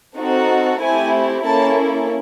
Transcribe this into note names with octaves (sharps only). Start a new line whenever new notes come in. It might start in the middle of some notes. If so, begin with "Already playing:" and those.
C4 D#4 F#4 A4
A3 C4 E4 G4 G#5
A#3 C#4 E4 A4 A5